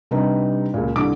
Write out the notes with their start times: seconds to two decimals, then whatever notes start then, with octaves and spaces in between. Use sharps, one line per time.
0.11 C3 G3 D4 D#4 B4
0.74 C#2 A#2
0.96 C2 D3 D6